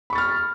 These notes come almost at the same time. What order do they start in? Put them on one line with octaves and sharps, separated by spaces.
B5 C#6 A6 F6